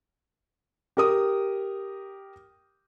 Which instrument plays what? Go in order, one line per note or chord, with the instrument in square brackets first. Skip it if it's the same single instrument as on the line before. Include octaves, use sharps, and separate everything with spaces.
[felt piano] G4 A#4 D#6